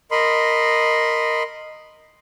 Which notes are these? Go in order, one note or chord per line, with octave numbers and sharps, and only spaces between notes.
A#4 D#5 B5 C6